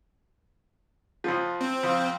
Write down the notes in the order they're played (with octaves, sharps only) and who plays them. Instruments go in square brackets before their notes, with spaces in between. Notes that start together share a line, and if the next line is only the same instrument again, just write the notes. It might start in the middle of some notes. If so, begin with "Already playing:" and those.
[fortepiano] F2 F3
[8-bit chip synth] C4
[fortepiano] F2 F4